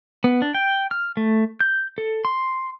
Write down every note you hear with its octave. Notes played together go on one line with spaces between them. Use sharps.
B3
D4
G5
F6
A3
G6
A4
C6